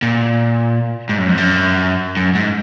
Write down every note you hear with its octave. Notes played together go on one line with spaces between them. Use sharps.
A#2
G#2
F#2
F2
F#2
F#2
G#2